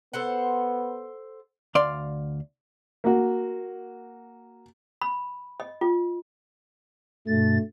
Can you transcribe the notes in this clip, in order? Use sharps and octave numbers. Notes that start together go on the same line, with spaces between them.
B3 A4 C5 F#5
D2 D5 F5 C6
A#3 F#4
B5
D#5
F4
G2 B2 A3 A6